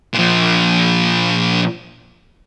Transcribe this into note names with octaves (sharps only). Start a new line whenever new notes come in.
A#2 F3